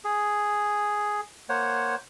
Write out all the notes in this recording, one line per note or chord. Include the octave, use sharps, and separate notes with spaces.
G#4
A#3 C5 C#5 F#5